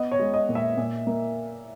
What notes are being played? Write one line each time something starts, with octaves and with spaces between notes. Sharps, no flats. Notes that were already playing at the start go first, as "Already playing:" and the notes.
Already playing: B3 D#5
C#5
G#3
D#5
A#2
E5
A#2
A#3